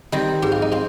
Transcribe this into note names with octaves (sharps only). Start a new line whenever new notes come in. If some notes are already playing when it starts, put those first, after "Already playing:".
D#3 G3 C4 D#4
G#2 G4
F4
D#4
C4 F4